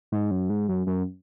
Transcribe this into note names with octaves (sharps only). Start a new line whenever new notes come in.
G#2
F#2
G#2
F#2
F#2